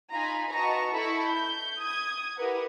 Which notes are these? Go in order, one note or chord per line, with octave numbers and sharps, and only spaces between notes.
D#4 F4 G#5 A#5 B5
F#4 B4 D#5 A5 A#5 C#6
E4 A4 B5 C#6
G6
D#6 G#6
E4 G4 A#4 B4 F#5